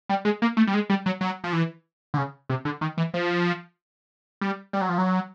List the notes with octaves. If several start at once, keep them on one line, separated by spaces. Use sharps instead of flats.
G3
G#3
A#3
A3
G3
G#3
G3
F#3
F#3
F3
E3
D3
C#3
C3
D3
D#3
E3
F3
G3
G3
F#3
F3
F#3